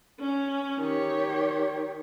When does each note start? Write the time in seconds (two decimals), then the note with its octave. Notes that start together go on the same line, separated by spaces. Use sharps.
0.20 C#4
0.82 D#3 G4 C#5